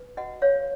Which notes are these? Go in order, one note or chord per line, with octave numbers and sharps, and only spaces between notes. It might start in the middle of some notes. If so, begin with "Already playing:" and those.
Already playing: B4
F#4 D#5 F#5
B4 C#5 F5